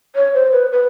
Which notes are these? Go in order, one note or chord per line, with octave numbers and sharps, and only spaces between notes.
C#5
C5
B4
B4